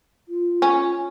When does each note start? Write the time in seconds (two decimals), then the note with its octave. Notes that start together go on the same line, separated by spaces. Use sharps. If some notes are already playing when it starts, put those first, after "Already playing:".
0.28 F4
0.62 C#4